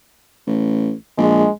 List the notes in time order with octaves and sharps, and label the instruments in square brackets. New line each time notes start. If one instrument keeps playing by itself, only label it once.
[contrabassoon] A1
[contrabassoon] A#1 [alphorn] G#3